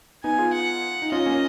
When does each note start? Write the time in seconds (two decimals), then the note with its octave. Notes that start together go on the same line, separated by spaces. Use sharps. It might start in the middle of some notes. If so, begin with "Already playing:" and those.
0.24 B3 D#4 G#5
0.38 F4 G#4
0.53 F#5
1.02 D#4
1.12 C#4 F4 D#5
1.26 A#3 C#4